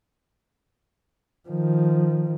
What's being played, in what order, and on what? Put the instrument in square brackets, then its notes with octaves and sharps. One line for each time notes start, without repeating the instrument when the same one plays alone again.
[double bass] D#3 F3